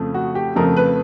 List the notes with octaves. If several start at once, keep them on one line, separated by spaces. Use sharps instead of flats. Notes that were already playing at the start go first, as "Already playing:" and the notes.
Already playing: F2 C#3 F3 A3
F#4
G4
F2 C#3 F3 A3 A#4
B4